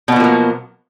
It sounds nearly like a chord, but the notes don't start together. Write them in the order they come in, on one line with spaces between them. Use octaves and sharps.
B2 B3 F3 A#3 F#3